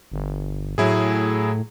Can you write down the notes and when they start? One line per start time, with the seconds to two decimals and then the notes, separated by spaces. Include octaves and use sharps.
0.12 G1
0.78 A2 F#3 E4 G#4